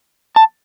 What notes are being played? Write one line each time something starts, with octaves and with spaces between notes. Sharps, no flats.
A5